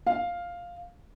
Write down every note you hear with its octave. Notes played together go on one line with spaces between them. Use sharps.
F5